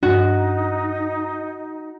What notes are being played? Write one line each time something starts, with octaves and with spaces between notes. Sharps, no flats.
G2 D4 D#4 F#4